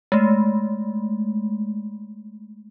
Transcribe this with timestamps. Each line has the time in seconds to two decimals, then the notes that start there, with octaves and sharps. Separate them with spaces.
0.12 G#3 A3